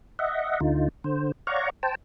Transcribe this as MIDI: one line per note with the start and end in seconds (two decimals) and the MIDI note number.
0.19 0.60 75
0.19 0.60 76
0.19 0.60 78
0.60 0.88 38
0.60 0.88 50
0.60 0.88 63
0.60 0.88 65
1.04 1.32 50
1.04 1.32 72
1.47 1.70 73
1.47 1.70 74
1.47 1.70 77
1.47 1.70 78
1.47 1.70 82
1.47 1.70 85
1.83 1.95 72
1.83 1.95 79
1.83 1.95 81